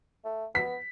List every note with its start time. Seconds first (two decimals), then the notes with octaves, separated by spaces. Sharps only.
0.25 A3
0.55 B3 B6